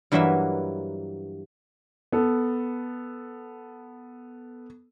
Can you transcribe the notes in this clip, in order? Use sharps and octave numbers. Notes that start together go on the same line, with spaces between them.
G2 E3 F#3 A#3 B4 E5
B3 A4